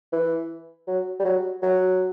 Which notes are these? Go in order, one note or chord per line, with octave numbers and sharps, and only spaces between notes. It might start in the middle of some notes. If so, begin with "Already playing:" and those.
E3
F#3
G3
F#3
F#3